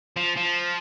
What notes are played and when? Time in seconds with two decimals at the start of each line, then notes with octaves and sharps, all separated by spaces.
0.16 F3
0.37 F3